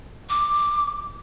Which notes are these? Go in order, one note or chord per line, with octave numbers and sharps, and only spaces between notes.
D6